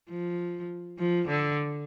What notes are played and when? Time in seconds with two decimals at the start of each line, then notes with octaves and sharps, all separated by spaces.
0.10 F3
0.99 F3
1.28 D3